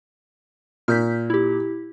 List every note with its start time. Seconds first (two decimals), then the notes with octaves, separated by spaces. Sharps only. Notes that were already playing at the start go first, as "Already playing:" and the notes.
0.88 A#2 F6 G6 B6
1.30 E4 G4